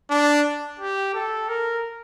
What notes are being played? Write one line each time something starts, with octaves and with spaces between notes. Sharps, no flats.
D4
G4
A4
A#4